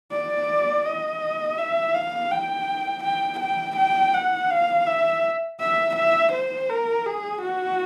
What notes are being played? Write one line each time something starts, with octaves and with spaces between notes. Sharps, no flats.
D5
D#5
E5
F5
G5
G5
G5
G5
F#5
F5
E5
E5
E5
C5
A#4
G#4
F#4